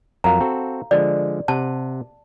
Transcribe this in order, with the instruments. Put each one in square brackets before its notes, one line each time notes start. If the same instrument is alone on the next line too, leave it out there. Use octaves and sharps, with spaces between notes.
[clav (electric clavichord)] F2 F#3 A#4 [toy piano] F5 A#5
[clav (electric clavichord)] C4 F#4 A4
[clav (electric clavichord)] D3 F3 G#3 [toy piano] D5
[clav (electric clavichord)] C3 F#5 [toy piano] A5